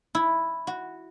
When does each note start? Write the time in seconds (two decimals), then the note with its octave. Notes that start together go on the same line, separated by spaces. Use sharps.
0.15 E4
0.67 F#4